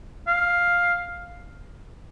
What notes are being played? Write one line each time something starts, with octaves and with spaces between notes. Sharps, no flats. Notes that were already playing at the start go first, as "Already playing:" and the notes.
F5